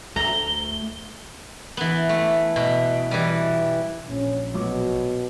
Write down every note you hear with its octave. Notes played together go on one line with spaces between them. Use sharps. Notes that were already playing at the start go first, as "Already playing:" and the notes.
D2 A3 A#5 G7
E3 B3
A3
B2
E3 G3
A#1 C#4
B2 F#3 D6